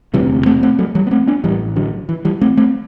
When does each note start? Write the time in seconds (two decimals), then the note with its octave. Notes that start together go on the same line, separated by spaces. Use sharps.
0.14 E1 D2 C3 E3 G3
0.46 A3 C4
0.63 A3 C4
0.79 F#3 A3
0.95 E3 G3
1.07 B3
1.11 A3 C4
1.27 B3 D4
1.44 A1 A2 E3 G3
1.76 D3 F#3
2.09 E3
2.25 E3 G3
2.42 A3 C4
2.57 A3 C4